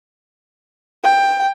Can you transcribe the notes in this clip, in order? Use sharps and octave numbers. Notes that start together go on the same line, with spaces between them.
G5